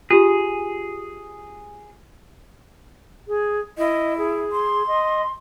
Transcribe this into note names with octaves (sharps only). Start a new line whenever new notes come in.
F4 G4 G#4
G#4
E4 D#5
G#4
C6
D#5